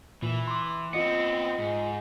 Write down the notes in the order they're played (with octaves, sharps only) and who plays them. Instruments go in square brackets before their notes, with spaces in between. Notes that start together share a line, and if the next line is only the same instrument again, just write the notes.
[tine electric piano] A#2 [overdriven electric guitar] E3
[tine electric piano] C6 D6
[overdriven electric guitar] B3 C4 [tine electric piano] F4 D#5 C#7
[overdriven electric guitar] G#2